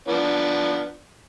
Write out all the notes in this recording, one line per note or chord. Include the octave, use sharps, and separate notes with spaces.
F3 B3 D4